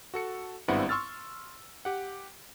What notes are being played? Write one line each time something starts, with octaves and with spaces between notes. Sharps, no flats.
F#4 A4 C#7
G#1 G2 B3 C4 E4 F#5
C6 C#6 E6 F6 A6
G4 F#5